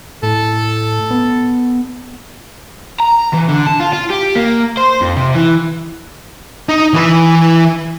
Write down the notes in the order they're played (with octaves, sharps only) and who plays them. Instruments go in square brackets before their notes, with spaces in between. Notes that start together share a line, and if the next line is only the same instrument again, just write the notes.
[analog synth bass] A2 [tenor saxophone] A4
[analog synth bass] B3
[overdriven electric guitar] A#5
E3
D3
A5
F4
F4
G4
A#3
C5
F2
C3
E3
[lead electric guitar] D#4
E3 B4